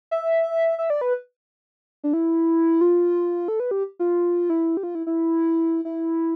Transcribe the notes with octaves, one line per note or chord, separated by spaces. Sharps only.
E5
E5
D5
B4
D4
E4
F4
A4
B4
G4
F4
E4
G4
F4
E4
E4
E4